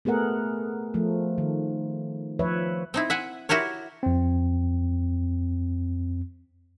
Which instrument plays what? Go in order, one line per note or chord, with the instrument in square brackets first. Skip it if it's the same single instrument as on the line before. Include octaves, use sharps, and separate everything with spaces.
[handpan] A3 B3 G#4 A#4 F#5
F3 A3
D#3
F3 B4 C#5 E5
[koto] C4 D#4 E4
E5 F#5 G#5
E4 F#4 G4 A#4 C#5
[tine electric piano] F2 C4